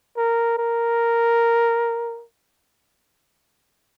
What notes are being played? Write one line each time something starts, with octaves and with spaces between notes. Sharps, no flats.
A#4
A#4